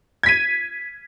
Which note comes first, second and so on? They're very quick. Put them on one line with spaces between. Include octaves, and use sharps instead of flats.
G#6 B6 D#7